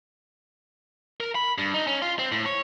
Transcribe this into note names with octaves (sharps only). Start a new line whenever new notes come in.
A#4
B5
G2
D#4
C#4
F4
C4
A2
C#5